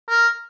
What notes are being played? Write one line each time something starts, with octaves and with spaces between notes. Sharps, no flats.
A#4